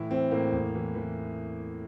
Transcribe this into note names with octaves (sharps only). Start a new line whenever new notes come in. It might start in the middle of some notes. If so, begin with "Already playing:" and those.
Already playing: A2 E3 E4
E3 C4
A2 A#3
E2
E3
E3